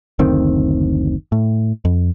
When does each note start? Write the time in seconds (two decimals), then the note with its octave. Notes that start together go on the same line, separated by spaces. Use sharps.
0.19 F#1 D2 D#3 C4
1.32 A2
1.85 F2